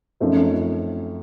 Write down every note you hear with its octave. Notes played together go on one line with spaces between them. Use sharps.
F#2 F3 A3 C4 D#4